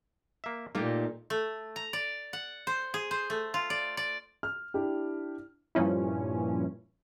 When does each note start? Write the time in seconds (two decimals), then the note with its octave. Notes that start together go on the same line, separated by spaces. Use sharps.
0.44 A#3 E5
0.75 A#2 A3 A#3 D#4 G4
1.30 A3
1.76 A#5
1.93 D5
2.33 F#5
2.67 C5
2.94 G#4
3.11 C5
3.30 A3
3.54 F4
3.70 D5
3.97 D5
4.43 F6
4.74 D4 E4 G4
5.75 G2 A#2 F3 C#4 E4